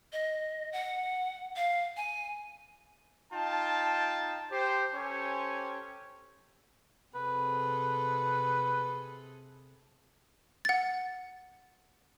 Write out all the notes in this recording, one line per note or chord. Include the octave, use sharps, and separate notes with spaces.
D#5
F#5
F5
G#5
D#4 F4 G5 A5
G4 C5
C#4 G4 A4 C5 C#5 G#5
C3 G#4 A4 B4
F#5 A6